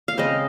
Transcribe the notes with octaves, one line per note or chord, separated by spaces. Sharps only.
F5
C#3 G#3 C4 C5 D#5